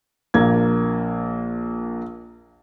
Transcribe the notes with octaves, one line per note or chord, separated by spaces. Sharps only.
A#1 A#3 G#6